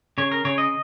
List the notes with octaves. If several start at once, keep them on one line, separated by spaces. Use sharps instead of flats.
C#3 C#5
A#4
C#3 C#5
D#5